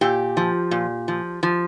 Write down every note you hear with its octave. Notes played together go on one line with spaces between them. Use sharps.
A#2 G4
F3
A#2
F3
F3